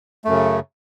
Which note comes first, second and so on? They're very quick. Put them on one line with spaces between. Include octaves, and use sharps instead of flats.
A3 F#2 C#3